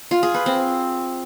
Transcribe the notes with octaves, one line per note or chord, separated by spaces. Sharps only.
F4
G#4
B4
C4